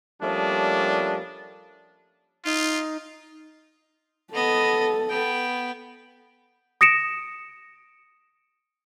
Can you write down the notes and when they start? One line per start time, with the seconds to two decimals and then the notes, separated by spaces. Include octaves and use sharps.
0.22 F3 G3 A3 A#3 C#4 D4
2.45 D#4 F4
4.33 B3 A4 D#5
5.10 B3 G5
6.81 D#6 A#6 C#7 D7 E7